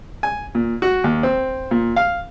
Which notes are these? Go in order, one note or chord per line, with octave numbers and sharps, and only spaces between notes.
G#5
A#2
F#4
D#2
C4
A#2
F5